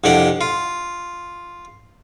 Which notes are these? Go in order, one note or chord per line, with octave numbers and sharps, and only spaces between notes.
C2 F2 D4 G4 F#5
F4